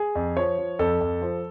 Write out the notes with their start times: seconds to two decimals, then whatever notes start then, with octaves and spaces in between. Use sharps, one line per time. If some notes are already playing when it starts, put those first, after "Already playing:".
Already playing: G#4
0.15 F2
0.37 F3 C#5
0.58 F3
0.79 F2 A4
1.01 F2
1.22 F3